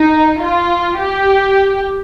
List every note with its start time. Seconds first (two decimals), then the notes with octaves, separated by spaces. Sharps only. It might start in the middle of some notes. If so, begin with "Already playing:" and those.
Already playing: D#4
0.42 F4
1.01 G4